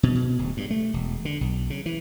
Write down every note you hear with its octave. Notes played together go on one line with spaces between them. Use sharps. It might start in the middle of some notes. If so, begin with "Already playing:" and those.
B2
B2
D1
G2
A3
E1
D3
B1
C#3
E3